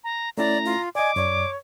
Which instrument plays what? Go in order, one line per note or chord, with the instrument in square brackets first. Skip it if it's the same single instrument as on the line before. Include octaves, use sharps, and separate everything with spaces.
[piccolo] A#5
[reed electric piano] A3 C#4 E4 [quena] D5 [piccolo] A#5
[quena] F4
[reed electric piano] D5 D#5 [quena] G#5 [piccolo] D6
[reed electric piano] F#2 D5 [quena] C#5